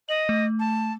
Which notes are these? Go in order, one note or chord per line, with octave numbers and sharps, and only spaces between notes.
D#5 F#7
A3
A5